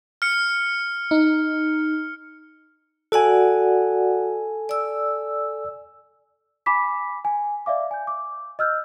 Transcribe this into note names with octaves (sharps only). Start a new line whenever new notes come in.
F6 C#7
D#4
F#4 A4 D5 F#5 G#5
D5 E6
G#5 B5 D6 B6
G#5
D5 E5 F5 D6
G#5 G6
D6
D#5 E6 F6 G6